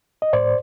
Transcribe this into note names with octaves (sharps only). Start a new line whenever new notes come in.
D#5
A2 C5 D5